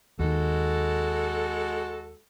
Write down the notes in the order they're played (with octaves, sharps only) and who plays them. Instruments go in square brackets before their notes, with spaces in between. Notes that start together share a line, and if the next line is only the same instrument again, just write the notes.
[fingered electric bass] D#2 D#3 [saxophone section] G#3 F#4 A4